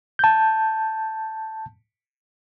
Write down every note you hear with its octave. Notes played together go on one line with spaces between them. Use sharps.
A5 G6